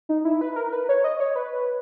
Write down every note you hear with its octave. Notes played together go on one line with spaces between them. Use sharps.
D#4
E4
B4
A#4
B4
C#5
D#5
C#5
B4